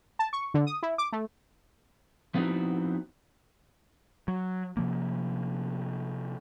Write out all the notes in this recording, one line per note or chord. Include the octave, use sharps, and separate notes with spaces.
A5
C#6
D3
D#6
E4
D6
A3
F3 B3 C4 D#4 E4 F#4
F#3
C3 F3 A#3